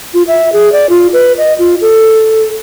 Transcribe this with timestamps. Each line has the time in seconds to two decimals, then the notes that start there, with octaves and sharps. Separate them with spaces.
0.14 F4
0.28 E5
0.53 G#4
0.72 D5
0.90 F4
1.13 B4
1.38 D#5
1.59 F4
1.81 A4